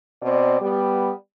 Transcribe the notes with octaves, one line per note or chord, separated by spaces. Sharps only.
B2 C4 D5
G3 B3